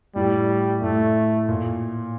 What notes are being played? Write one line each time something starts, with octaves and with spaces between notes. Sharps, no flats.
A2 G3
A2 A3
A#2